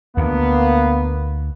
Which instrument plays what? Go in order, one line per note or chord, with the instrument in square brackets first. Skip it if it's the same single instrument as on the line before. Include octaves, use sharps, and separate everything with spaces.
[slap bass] D2 [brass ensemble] A#3 B3